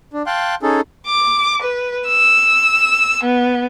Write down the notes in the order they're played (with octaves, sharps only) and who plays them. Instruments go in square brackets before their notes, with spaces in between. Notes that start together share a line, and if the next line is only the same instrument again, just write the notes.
[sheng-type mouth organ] D4
F5 G5 A5 C6 F#6
C#4 D#4 G#4 A4
[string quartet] D6
B4
E6
B3